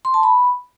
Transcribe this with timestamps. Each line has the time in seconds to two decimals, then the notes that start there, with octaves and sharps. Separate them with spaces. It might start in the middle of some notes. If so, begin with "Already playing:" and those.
0.05 C6
0.14 A5
0.23 B5